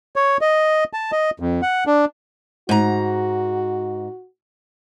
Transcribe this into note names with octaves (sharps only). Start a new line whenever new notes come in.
C#5
D#5
A5
D#5
F2
F#5
D4
G#2 F#4 A#5